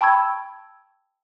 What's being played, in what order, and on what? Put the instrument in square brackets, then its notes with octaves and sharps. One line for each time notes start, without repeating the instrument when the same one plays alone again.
[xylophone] G5 A5 B5 C#6 E6 G#6